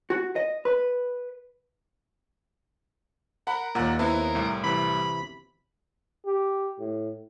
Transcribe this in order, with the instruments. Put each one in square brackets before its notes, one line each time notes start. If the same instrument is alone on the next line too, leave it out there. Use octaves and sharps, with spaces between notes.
[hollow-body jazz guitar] F#4
D#5
B4
[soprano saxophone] A#4 [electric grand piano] F#5 B5
[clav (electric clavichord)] D#2 A#3 [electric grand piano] A#2 F#5 A#5
[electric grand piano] B3 C4 E4 [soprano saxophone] A#4
[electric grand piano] C2 A2
[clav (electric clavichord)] C3 E3 [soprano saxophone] B5
[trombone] G4
A2